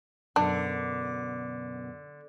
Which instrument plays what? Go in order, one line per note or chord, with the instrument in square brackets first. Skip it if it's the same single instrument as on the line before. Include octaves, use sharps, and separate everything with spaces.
[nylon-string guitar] F#2 B2 [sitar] D3 [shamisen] D4